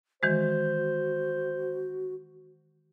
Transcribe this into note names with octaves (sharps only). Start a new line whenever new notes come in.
D#3 E3 G#3 F#4 C5